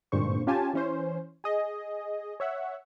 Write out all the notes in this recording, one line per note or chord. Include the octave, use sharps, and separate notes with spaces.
G#1 G2 A#2 D3 C5 C#6
C#4 F4 G4 G#5 A5
E3 C#4 C5
G#4 D#5
C#5 E5 F#5